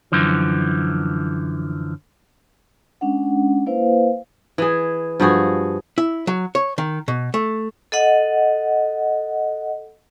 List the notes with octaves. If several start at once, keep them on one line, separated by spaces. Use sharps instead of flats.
F#2 D3 E3 F3
G#3 C#4 D4 F#5
A#3 E4 B4 C5 F5
E3 G#4
G2 F3 F#4 G#4
E4
F#3
C#5
D#3
B2
A3
A4 D#5 F#5